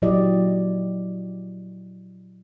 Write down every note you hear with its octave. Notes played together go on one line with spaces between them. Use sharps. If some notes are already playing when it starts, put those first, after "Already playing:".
A#2 F#3 E4 G4 D5 D#5